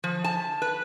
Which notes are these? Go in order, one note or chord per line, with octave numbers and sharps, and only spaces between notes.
F3
A5
B4